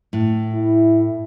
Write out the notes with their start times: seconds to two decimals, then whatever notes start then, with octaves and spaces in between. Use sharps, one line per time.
0.13 A2
0.55 E4